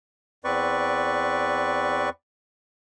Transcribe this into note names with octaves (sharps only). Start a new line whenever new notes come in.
E2 C4 B4 D5 C#6